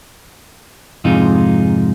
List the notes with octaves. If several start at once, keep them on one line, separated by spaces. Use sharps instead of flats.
F2 G#2 C3 G#3 D#4 F4